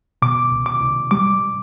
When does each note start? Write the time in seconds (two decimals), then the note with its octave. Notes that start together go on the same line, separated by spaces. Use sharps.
0.22 B2 D6
0.52 C2
0.66 D6
0.81 C2
1.11 G3 D6